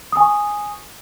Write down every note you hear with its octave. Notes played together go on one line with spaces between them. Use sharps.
G#5 C#6 D#6